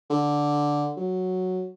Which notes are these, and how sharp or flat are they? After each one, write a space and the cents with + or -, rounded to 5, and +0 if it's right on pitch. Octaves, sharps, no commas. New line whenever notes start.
D3 -5
F#3 +0